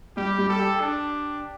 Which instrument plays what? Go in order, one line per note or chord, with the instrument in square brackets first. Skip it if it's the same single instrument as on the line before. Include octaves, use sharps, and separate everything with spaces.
[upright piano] G3 [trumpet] G4
[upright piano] G3
[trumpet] A4
[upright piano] G4
[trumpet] D4